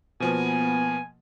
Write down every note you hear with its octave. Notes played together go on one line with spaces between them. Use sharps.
B2 F3 A#3 B3 G#5